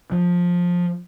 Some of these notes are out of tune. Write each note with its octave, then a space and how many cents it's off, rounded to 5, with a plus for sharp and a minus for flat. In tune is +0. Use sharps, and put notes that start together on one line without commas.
F3 +15